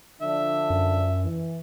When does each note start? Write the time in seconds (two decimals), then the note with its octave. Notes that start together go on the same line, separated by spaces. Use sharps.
0.22 D3 F3 D4 E5
0.70 F#2
1.24 E3